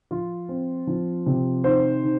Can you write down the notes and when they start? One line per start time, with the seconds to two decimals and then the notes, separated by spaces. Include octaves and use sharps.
0.11 F3 F4
0.49 C4
0.87 F3
1.26 C3
1.64 D#3 C5
2.03 D#3